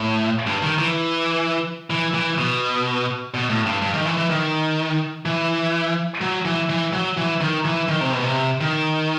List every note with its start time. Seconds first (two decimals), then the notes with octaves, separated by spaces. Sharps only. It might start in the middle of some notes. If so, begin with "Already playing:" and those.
Already playing: A2
0.47 G2
0.62 D#3
0.79 E3
1.90 E3
2.14 E3
2.38 B2
3.34 B2
3.50 A2
3.66 G2
3.82 G2
3.94 D#3
4.06 E3
4.18 E3
4.30 D#3
5.26 E3
6.21 F#3
6.45 E3
6.69 E3
6.93 F#3
7.17 E3
7.41 D#3
7.65 E3
7.89 D#3
8.01 C3
8.12 B2
8.24 C3
8.61 D#3